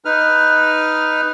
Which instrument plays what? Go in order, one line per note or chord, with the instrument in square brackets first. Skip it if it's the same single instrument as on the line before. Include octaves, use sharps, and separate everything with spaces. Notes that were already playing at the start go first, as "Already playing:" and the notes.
[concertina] D#4 B4 F6